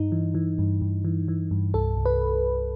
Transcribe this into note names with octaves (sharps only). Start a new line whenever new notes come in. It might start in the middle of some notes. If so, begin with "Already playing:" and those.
Already playing: G2 D#4
E3
E3
G2
G2
E3
E3
G2
C2 A4
C2
B4